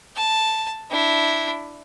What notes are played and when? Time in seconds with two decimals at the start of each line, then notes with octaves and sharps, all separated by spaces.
0.16 A5
0.90 D4 E4